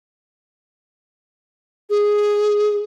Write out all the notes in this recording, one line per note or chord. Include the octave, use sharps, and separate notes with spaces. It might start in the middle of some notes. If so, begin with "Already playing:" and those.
G#4